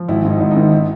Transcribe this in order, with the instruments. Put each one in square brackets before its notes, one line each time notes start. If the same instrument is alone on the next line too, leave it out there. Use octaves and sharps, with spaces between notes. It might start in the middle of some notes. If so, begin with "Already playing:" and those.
Already playing: [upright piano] F3
G#1 E4
G#2
D#4
G#1
D#4
D#3
E4